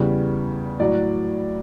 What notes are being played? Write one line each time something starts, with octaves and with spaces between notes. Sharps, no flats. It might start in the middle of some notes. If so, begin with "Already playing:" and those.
Already playing: E2 C#3 G3
A2 F#3 D5